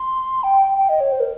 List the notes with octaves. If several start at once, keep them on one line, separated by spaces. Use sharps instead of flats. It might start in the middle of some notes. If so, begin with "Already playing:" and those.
Already playing: C6
G5
G5
D#5
C#5
C5
A#4